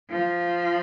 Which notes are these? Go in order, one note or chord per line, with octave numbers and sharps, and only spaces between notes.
F3